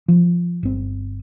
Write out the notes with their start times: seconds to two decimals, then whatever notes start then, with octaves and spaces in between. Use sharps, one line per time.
0.08 F3
0.63 G1 C4